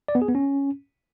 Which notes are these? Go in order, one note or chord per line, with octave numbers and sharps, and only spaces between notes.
D5
B3
G#4
B3
C#4